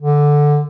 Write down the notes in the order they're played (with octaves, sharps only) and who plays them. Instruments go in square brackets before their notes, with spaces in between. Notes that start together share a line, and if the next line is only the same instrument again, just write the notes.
[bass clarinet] D3